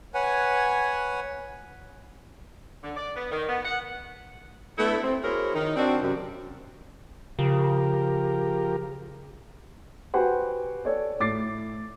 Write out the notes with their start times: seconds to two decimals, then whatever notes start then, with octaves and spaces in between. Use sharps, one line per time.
0.14 B4 C#5 F#5 G#5
2.83 D3
2.96 D5
3.16 B3
3.31 D#3
3.49 B3
3.65 F#5
4.78 A3 B3 D4 E4 A4 E5
5.03 C4
5.23 E4 F#4 G#4 A#4 C5 C#5
5.55 D#3 D#4
5.76 C4 D4 F#4
6.02 F#2 C3
7.39 C#3 F3 G4 A#4
10.14 F#4 G4 B4 C5 F#5 G#5
10.85 A4 C#5 D5
11.20 A2 D6 A6 C7